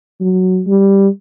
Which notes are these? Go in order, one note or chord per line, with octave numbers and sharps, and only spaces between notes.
F#3
G3